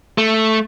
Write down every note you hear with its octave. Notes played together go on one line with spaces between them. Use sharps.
A3